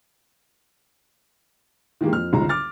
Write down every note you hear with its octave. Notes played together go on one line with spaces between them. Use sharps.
D#3 E3 G#3 A#3 G4
F2 F6
G1 C#2 D#3 A#5
D6 F6 A6